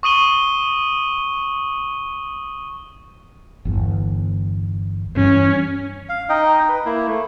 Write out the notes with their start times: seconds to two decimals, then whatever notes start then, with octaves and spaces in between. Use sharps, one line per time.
0.03 C#6 D#6 D#7 G7
3.65 G1 E2
5.16 G2 E3 C#4
6.09 F5
6.29 D#4 D#5 G5
6.69 B4
6.85 A#3 E4
7.08 A3